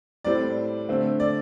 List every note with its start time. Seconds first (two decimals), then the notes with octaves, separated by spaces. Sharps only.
0.24 A2 G3 C4 D5
0.88 D3 A3 C4
1.20 D5